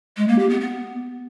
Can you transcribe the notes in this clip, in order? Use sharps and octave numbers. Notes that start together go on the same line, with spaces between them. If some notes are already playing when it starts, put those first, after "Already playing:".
G#3
A#3
G4
B3
B3